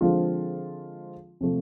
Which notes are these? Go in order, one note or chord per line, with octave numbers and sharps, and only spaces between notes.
D3 F3 G#3 C4 F4
C3 F3 A3